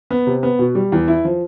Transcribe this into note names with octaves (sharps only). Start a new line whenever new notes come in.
B3
C3
B3
B2
G3
E2
E4
F3